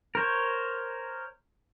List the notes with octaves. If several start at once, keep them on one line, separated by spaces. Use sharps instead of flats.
A#4 C5 C#5